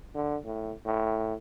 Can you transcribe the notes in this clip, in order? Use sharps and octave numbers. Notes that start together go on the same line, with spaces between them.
D3
A2
A2